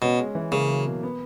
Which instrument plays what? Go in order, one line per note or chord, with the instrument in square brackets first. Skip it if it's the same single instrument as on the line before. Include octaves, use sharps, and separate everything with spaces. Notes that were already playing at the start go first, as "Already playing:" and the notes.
[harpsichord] B2 [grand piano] C#4
[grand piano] G#3
E3
[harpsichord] C#3 [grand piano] A#3
[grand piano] F#3
B2
B3